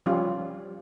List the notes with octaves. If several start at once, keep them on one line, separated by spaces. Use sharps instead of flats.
F3 G3 C#4 F4